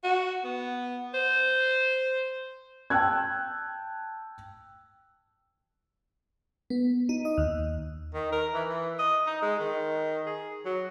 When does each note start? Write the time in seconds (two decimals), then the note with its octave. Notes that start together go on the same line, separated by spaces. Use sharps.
0.04 F#4
0.44 B3
1.14 C5
2.90 G5 A5 E6 F#6 G#6
6.70 B3
7.09 D#4
7.25 D#5
7.38 D#2
8.14 D#3
8.32 A#4
8.54 E3
8.69 E3
8.99 D#5
9.27 D#4
9.42 G#3
9.60 D#3
10.26 G#4
10.65 F#3